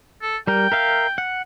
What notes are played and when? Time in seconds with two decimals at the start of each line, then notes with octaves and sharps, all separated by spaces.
0.22 A4
0.47 G3 A#4 G5
0.72 A#4 E5 F5
1.18 F#5